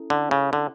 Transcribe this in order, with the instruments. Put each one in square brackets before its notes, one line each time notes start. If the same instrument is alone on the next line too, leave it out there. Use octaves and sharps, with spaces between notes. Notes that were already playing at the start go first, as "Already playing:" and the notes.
Already playing: [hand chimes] C#4 E4 A4
[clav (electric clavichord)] D3
C#3
D3